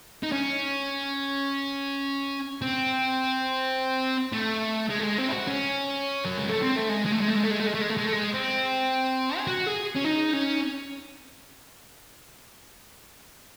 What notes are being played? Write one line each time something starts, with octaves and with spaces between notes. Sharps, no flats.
D#4
C#4
C4
A3
G#3
A3
G#3
C4
E4
F#4
C#4
F#3
G#3
A3
C4
A3
G#3
G#3
A3
G#3
A3
G#3
A3
G#3
A3
G#3
A3
G#3
A3
G#3
A3
G#3
C4
G#4
F#4
G#4
C#4
D#4
C#4